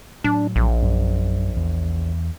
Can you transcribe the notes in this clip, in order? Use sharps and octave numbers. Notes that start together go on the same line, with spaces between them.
A2 F#3 D4
A#1
F#2
E2